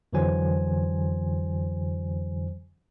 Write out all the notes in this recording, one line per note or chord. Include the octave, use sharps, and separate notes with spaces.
F2 D3 E3 F#3 C5 G#5